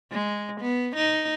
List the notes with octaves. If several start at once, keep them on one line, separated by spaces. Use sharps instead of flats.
G#3
B3
D#4